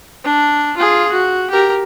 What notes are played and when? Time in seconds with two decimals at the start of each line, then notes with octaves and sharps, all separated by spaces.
0.24 D4
0.78 F4 G#4
1.12 F#4
1.51 G4 A#4